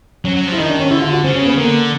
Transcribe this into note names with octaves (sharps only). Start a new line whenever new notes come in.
F#3 C#4
F#3
F3 E4
D#3 D#4
D4
C#4
D3 E4
F4
F#4
C#3 C4
C#4
B3
D3 A#3